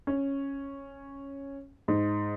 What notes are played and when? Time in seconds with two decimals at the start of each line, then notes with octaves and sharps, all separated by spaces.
0.07 C#4
1.88 G#2